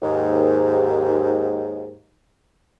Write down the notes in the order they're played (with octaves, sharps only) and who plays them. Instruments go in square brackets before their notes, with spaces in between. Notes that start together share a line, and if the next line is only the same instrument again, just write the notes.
[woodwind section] D#2 G#2